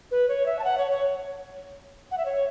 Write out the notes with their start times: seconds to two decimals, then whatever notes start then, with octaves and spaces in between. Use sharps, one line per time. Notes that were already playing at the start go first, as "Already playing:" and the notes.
0.11 B4
0.28 C#5
0.46 E5
0.59 A5
0.64 F#5
0.78 C#5
0.91 C#5
2.11 F#5
2.18 E5
2.25 C#5